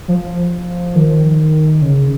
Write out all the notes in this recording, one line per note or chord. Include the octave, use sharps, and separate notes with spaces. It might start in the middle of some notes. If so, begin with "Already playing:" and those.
F3
D#3
C#3